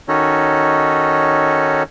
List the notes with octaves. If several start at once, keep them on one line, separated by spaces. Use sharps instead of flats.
D#3 C#4 D#4 F#4 A4 C#5